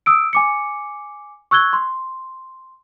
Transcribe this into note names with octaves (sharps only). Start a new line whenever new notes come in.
D#6 E6 D7
G#5 D6 C#7
C#6 E6 F#6 G#6 G7
C6